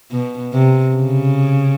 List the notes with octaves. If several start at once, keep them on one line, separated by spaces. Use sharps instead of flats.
B2
C3
C#3